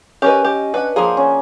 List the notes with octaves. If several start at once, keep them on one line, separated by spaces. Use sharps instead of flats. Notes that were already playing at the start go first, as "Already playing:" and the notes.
C#4 G4 A#4 B4 D#5
G4
D4 B4 F#5
F3 A#3 G#4 C5
C#4